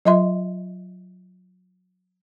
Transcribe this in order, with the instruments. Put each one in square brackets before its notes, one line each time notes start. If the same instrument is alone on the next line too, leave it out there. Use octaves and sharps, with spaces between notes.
[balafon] F#3 F4 D#5 E5 C6